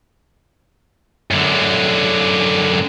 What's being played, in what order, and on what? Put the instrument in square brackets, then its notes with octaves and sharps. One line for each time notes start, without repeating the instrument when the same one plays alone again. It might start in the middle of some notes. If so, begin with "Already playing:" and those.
[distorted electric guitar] F#2 D3